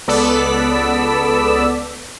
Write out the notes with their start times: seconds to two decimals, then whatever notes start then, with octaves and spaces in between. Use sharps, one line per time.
0.08 C#2 B3 A4 D5 E6 B6